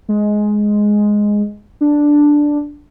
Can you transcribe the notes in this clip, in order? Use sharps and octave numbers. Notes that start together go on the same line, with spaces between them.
G#3
D4